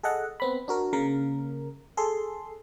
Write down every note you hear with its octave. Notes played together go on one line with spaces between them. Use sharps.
G#4 A4 D#5 F#5
B3 C4 B5
D4 F#4 A#4
C#3 A#3 A#4
G#4 A4 C6